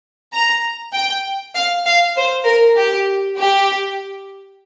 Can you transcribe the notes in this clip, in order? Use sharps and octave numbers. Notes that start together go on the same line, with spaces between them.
A#5
G5
F5
F5
C5
A#4
G4
G4